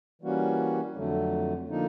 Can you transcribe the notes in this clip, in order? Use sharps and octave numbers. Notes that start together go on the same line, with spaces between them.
E3 G3 A#3 C#4 F#4
F2 D3 F#3 A3
D3 F3 A#3 D#4